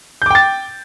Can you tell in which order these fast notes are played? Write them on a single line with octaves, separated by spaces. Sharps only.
G6 D6 G5 A6